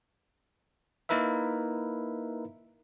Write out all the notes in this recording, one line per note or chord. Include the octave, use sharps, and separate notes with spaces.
A#3 D#4 E4 A#4 B4 E5